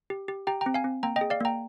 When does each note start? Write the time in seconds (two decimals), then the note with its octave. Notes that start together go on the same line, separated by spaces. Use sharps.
0.10 G4
0.28 G4
0.47 G4 G5 A#5
0.61 G5 A#5
0.66 C4
0.74 F5 G#5
0.84 C4
1.03 A#3 G5 A#5
1.16 D#5 G5
1.21 G#4
1.30 D5 F5
1.40 A#3 G5 A#5